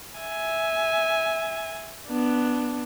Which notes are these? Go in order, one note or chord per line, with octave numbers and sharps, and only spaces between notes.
E5 G#5
B3 D4